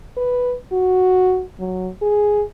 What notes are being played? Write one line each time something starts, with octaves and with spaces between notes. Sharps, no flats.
B4
F#4
F#3
G#4